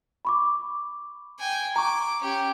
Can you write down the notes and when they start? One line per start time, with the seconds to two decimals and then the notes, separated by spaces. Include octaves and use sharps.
0.25 B5 C#6 D6
1.40 G5 G#5
1.76 A#5 C#6 D6
2.22 C#4 G4